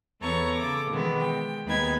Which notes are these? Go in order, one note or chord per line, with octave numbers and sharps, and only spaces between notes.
E2 B3 A4 C#5 A#5 C#6
C#3 A4 D6
B2 D#3 E3 G#3 B3
G5
D#2 G#3 B3 D#4 B5 G#6